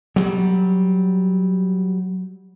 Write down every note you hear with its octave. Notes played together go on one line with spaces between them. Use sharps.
F#3 G3